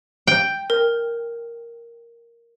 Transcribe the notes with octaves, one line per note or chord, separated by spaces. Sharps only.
G5
A#4